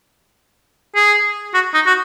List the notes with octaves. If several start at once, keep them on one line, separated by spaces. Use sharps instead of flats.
G#4
F#4
D#4
F#4